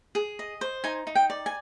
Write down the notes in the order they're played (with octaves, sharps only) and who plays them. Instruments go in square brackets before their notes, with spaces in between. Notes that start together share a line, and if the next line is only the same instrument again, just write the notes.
[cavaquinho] G#4
D#5
C5
D#4 G#5
D#4
G5
D5
G#5